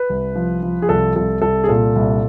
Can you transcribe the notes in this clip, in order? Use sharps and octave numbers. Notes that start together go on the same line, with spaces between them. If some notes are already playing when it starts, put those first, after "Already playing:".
Already playing: B4
C2
F3
F3
G#4
C2 A4
C2 A4
C2 A4
G#4
A#2 A4
C2